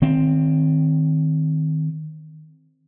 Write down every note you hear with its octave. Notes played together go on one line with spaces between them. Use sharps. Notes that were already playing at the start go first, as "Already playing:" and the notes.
D#3 C4